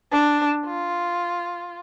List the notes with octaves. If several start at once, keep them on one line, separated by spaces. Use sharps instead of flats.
D4
F4